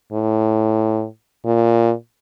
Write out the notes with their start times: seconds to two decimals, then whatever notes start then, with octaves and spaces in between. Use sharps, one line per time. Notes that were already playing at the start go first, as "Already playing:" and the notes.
0.13 A2
1.46 A#2